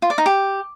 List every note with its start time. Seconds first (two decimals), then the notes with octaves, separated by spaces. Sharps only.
0.02 F4
0.10 D5
0.18 D#4
0.26 G4